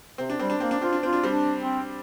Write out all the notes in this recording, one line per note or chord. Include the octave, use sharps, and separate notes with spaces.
C3 C4
D4
G3 C4
D4
A#3 C4
D4
C4 F4
D4
C4 F4
D4
G3 C4
D4
C4